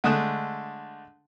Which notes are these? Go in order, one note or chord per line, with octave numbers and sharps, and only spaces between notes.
D3 G#3 A3 A5 D#6 F#6